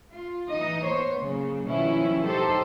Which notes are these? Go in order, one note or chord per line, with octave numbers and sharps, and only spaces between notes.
F4
E3 D#4 D#5
B3 C5 C#5
C#3 F#3 A#3
B2 D#3 F3 G3 C#4 E4
F#3 D#4 G4 A4 C5